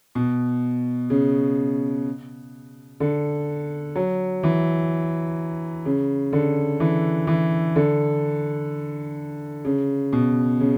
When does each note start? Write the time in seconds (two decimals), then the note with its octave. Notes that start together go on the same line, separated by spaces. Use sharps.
0.15 B2
1.10 C#3
3.00 D3
3.96 F#3
4.43 E3
5.85 C#3
6.33 D3
6.80 E3
7.27 E3
7.76 D3
9.65 C#3
10.13 B2
10.60 C#3